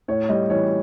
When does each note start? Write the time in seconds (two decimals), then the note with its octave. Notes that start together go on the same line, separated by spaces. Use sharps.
0.08 A2 C#5
0.29 G3 D#5
0.50 E3 C#5